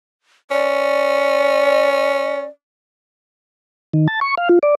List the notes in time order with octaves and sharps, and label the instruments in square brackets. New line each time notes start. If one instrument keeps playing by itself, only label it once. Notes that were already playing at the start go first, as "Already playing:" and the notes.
[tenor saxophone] C#4 [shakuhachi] D5
[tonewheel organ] D#3
A5
C#6
F5
F4
D5